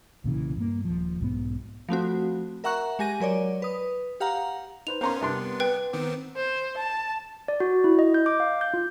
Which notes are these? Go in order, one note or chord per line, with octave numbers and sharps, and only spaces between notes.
B1 A#2 C#3 E3
G2 A#3
D#1 F3
B1 G#2 B3
F3 A3 C4 F#4
A#4 E5 F#5 A#5 C#6 F#6
G#3 G4 G#5 A#6 D#7
F#3 A#4 C#5 D5
B4 D#6
G4 F5 F#5 A#5
D#4 B4 C5 F7
B3 C#4 A#4 C5 F5 A#5 C6 C#6
C3 G3 B3 D4 A#4 C6
B4 G5
D#3 B3 C4 D6
C5
A5
D5
F#4
E4
D#5
G6
D6
F5
G6
F4